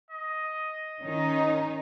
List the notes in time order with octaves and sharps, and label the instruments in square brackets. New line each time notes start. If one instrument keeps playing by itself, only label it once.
[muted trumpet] D#5
[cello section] D#3 C#4 D#4